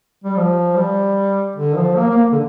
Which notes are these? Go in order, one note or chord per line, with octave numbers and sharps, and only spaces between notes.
G3
F3
G3
D3
F3
A#3
A#3
D3